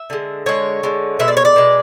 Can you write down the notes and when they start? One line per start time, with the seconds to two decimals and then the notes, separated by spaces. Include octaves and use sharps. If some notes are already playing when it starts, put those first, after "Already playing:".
Already playing: E5
0.10 D3 G#3
0.46 D3 G#3 C#5
0.83 D3 G#3
1.19 B2 G#3 E5
1.28 D5
1.37 C#5
1.45 D5
1.56 B2 G#3